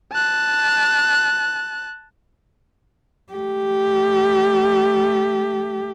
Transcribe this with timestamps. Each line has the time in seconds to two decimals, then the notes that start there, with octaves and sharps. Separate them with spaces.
0.13 A5 F#6
3.33 A3 G4